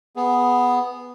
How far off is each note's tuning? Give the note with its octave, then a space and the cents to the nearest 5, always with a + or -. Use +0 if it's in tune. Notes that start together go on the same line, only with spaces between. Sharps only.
B3 +0 G#4 +0